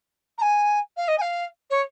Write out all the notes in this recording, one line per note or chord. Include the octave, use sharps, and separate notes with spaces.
A#5
G#5
F5
D#5
G#5
F5
C#5